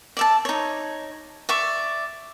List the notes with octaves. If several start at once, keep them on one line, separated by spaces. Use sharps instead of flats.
D5 E5 A5
D#4 C#5
D5 E5 C#6